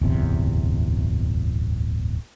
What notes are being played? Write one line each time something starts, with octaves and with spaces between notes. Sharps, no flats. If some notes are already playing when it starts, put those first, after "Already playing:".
D1 G1 E2 C3